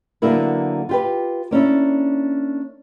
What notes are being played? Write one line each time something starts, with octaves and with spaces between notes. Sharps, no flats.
D3 F#3 A#3 B3 E4 A#4
F4 G4 B4
A#3 C#4 D4 E4